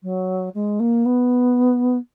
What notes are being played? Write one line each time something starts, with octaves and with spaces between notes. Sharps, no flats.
F#3
G#3
A#3
B3